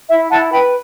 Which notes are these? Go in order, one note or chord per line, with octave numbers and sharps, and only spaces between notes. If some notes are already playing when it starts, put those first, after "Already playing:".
E4 E5
E4 F#5 A5
B4 G5 B5